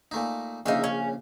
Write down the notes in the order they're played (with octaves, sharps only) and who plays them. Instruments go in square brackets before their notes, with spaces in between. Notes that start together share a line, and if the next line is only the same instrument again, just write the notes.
[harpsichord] A#2 A3 D#4
[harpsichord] A#1 C#3 F5 [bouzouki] D#4 E5
[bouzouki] C#4